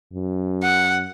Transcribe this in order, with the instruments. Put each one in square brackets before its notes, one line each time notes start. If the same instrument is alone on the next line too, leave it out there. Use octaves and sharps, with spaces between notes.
[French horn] F#2
[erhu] F#5